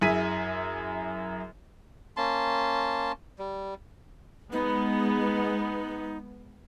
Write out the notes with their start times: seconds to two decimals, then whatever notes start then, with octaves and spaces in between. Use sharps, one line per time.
0.01 F#2 E4 G#4 B6 D#7
2.17 A#3 C#4 A5 C6
3.38 G3
4.52 G#3 B3 D#4